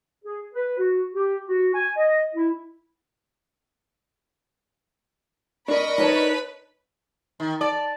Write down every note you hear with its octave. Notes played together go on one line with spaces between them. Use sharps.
G#4
B4
F#4
G4
F#4
G#5
D#5
E4
D4 A#4 D#5 B5 C#6
D#4 B4 C#5 A5
D#3
D5 A5